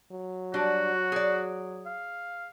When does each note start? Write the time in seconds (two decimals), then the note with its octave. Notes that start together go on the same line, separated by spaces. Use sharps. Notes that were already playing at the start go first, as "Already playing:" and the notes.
0.12 F#3
0.54 G3 D4 F#4
1.12 G#4 D5
1.86 F5